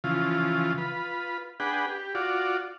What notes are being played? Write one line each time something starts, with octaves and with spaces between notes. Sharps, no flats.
C#3 E3 F3 F4
F4 B4
D4 G#4 B4 F#5 G5
G4
F4 F#4 D5